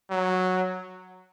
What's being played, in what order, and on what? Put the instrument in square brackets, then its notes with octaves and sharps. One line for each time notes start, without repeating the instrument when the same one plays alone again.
[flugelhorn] F#3